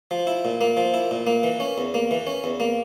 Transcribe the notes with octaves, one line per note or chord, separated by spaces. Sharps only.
F3
E4
A#2
A#3
F3
E4
A#2
A#3
E3
C#4
E2
A#3
E3
C#4
E2
A#3